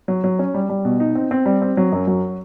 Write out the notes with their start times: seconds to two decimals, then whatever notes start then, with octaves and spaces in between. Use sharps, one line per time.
0.08 F#3
0.24 F#3
0.39 C#4
0.54 G3
0.69 G3
0.85 B2
1.00 D#4
1.15 C4
1.31 C4
1.46 G3
1.62 C4
1.77 F#3
1.92 F#2
2.07 F#3